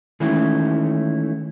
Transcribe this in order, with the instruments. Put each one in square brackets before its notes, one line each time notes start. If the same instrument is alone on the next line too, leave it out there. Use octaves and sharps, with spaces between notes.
[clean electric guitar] D#3 E3 G#3 A3 C#4 E4